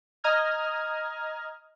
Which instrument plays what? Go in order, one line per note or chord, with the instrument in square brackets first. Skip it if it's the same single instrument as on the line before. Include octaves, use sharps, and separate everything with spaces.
[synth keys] D#5 A#5 D#6 F6 G#6